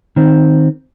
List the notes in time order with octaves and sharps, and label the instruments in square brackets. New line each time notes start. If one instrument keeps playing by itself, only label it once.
[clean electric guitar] D#3 C4